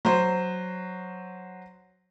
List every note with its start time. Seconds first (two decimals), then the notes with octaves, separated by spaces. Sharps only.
0.05 F#3 C5